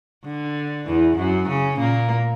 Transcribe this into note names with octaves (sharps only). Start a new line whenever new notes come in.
D3
E2 E3
F#2 F#3
C#3 C#4
A#2 A#3